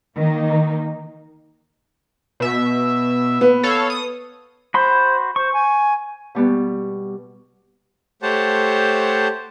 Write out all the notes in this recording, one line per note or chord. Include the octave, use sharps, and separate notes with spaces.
D#3 A#3 D#4
B2 E5
B3
A4 C#5 F5
D#6
F#4 C5 B5 C6
C5 C#6
G#5
B2 G3 B3
A3 G4 C5 C#5 F#5 A5